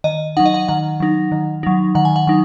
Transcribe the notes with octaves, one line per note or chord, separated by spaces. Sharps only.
D#3 D#5
F#3 D#4 F#5
D#5
F#5
D#3 F#5
F#3 D#4
D#3
F#3 D#4
D#3 F#5
G#5
F#5
F#3 D#4